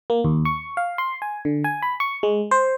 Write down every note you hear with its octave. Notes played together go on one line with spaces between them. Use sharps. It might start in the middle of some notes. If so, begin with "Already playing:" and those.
A#3
D#2
C#6
F5
C6
G#5
D3
G#5
B5
C#6
G#3
C5